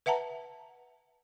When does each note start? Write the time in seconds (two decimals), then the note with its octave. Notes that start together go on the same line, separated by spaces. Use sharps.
0.06 B4 E5 F#5 A5 A#5